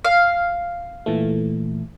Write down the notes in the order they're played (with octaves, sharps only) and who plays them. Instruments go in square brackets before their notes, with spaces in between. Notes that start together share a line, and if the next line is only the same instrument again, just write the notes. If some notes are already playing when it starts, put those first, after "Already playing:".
[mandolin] F5
[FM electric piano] A#2 E3 A3